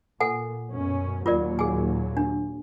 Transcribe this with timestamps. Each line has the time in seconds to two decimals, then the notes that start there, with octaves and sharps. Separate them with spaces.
0.20 A#2 A4 F#5 G#5
0.70 F#2 B2 C#4
1.26 D#2 A#2 F#3 F4 A#4 D5
1.59 G#4 G#5
2.17 D4